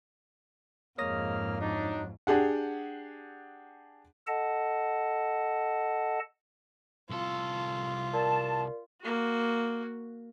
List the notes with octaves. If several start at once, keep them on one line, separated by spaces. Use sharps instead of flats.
F2 G#2 G#3 A#3 C#5 D#6 F6 A#6
F#3 D4 D#4
D4 G4 G#4 F#5
A4 D#5 F#5 A5
C2 F4 A4
A#4 D5 A5
A#3 F#4